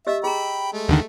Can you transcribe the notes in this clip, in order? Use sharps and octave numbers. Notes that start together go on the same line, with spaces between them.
G4 D#5 E5 E6
G#4 G5 A#5 B5
G#3 A3
D#2 D3 D#3